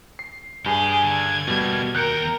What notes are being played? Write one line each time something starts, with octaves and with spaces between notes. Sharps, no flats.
C7
G2 G4 G#4
D3 G#6
B2 G3 A3 A#3
D#2 A#4 G5 F#6 G6 C#7